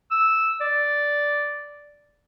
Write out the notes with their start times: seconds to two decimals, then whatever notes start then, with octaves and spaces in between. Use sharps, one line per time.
0.11 E6
0.61 D5